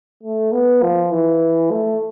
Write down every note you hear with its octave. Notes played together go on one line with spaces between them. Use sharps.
A3
B3
F3
E3
A3